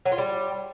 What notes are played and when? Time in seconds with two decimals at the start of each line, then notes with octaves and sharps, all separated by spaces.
0.05 F#3
0.12 F4
0.18 G3